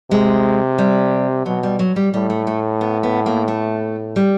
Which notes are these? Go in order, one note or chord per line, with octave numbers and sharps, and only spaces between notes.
C3 G#3
G3
B2 F#3
G3
F#3
G3
A2 G3
A3
A3
B3
B3
A#3
A3
G3